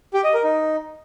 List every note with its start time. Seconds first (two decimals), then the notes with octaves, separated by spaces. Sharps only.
0.14 G4
0.24 D#5
0.34 A#4
0.44 D#4